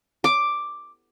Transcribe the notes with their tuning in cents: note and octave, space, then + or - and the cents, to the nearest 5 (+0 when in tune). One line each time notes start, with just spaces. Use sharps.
D6 +5